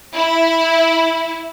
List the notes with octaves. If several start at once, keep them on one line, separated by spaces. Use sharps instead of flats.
E4